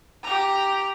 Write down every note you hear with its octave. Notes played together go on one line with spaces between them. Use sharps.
G4 A#5